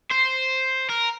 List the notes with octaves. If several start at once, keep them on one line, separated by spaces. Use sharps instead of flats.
C5
A#4